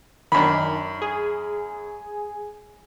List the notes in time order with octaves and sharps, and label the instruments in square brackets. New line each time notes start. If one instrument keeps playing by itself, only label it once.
[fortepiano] F#2 B5 [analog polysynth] D#3 D4
[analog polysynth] G#4